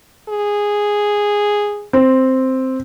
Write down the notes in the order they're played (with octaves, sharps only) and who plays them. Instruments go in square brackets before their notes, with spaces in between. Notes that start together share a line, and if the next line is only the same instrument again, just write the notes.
[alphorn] G#4
[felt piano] C4